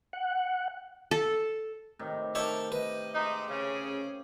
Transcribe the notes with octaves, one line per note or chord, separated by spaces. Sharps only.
F#5
A4
A2 C3 D#3
D#4 G4 A#4 C#5 E5 A5
B4 D#5
G#3 D#4 E5
C#3 C#4 G#4